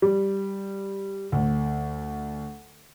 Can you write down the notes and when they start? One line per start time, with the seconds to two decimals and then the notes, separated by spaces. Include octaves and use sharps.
0.02 G3
1.32 D2